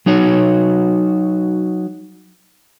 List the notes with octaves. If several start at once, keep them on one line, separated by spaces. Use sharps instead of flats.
F#3 D#4 F#4 C#5